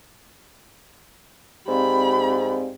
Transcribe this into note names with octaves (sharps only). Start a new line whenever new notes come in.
G#2 C4 G4 D5 F5 B5